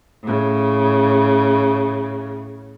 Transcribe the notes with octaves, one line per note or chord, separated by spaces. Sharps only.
A2 C#3